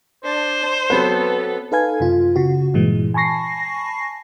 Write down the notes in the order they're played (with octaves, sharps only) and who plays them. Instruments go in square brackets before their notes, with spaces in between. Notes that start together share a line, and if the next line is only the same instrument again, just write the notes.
[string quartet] D4 [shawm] C5
[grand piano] F#3 C4 B4 [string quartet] B3 A4
[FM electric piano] D#4 A4 B4 F5 G#5 G#6
F#2 C3 F4
C#3 F#4
G2 A#2 E3 G#3
G#5 A5 B5 C#6 A#6 C7